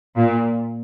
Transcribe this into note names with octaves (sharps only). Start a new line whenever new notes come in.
A#2